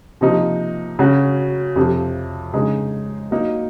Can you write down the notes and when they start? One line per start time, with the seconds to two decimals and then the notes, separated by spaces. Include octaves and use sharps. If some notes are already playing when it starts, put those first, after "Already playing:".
0.21 C3 F3 A#3 D#4
0.99 C#3 F#3 C#4 F#4
1.76 F2 C3 F3
2.54 C#3 G#3 D#4 G#4
3.31 F#3 A#3 D#4